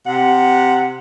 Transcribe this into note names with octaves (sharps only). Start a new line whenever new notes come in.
C3 F#5